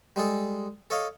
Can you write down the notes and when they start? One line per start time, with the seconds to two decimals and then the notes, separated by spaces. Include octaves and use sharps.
0.16 G3 G#3 G#4 A4
0.90 A4 C#5 D#5 F5